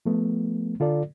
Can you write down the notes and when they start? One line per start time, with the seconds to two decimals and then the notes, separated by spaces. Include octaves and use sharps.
0.06 F3 A3 B3
0.80 D3 F4 A4 D5